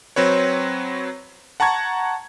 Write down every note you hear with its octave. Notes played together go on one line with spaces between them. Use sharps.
F#3 C4 B4 C#5
F#5 A5 A#5 C#6 G#6